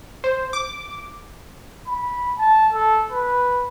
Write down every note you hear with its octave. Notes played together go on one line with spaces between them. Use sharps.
C5
D6
B5
A5
A4
B4